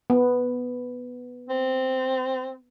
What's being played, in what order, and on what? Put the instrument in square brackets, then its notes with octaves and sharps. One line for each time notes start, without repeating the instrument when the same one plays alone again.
[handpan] B3
[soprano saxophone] C4